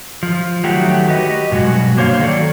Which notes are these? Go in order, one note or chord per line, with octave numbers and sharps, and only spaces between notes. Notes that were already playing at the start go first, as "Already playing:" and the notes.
F3
D#3 F#3 A3 F#4 G4
F#4 G4 B4 D#5
G2 B2 F#3 G#3 F#4
D3 A#3 C5 C#5 F5
D#3 F#3 A4 D5